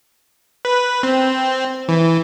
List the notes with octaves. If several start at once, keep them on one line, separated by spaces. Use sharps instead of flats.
B4
C4
E3